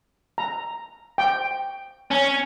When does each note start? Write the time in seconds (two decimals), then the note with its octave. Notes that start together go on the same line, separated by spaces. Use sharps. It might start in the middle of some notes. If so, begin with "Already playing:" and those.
0.38 A#5
1.18 G5
2.11 C#4